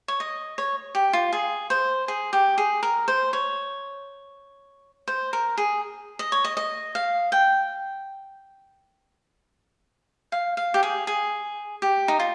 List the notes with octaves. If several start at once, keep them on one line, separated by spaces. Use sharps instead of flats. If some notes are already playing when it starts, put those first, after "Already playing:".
C#5
D#5
C#5
G4
F4
G#4
C5
G#4
G4
G#4
A#4
C5
C#5
C5
A#4
G#4
D#5
C#5
D#5
D#5
F5
G5
F5
F5
G4
G#4
G#4
G4
D#4
F4